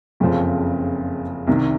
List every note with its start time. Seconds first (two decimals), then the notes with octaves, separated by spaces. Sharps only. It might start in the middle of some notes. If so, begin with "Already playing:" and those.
0.20 F#1 F2 C#3 F3 C4
1.47 C2 C3 D#3